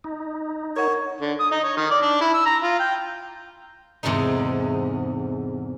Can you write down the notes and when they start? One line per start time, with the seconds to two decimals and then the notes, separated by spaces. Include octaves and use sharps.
0.04 D#4
0.76 A#4 C#5 F#5
1.21 D3
1.40 D#6
1.51 D#4
1.64 C#5
1.77 D#3
1.91 D5
2.02 D4
2.21 E4
2.34 E6
2.46 A#5
2.62 F4
2.79 G5
4.03 E2 G#2 C3 A3 D#4